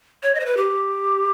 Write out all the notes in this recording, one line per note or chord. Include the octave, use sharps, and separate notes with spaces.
C#5
D#5
C5
B4
G4